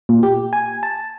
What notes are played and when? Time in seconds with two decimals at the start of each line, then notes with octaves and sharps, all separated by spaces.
0.09 A#2
0.23 G4
0.53 G#5
0.83 A5